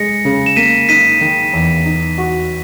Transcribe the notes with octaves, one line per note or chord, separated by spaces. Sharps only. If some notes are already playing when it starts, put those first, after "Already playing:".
Already playing: G#3 G#4 A#6 C#7
C#3
E7
A#3 B6 D#7
D#4 B6 D#7
D#3
E2
D#4
F#4